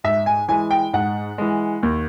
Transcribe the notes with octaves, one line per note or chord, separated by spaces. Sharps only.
G#2 E5
G#5
E3 G#3 G#5
G5
G#2 F#5
E3 G#3
D#2